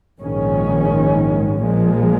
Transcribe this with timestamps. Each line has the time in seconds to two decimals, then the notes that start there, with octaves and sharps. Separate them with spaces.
0.20 A#1 G#2 D#3 G#3 C#4
1.60 A#1 A#2 F3 G#3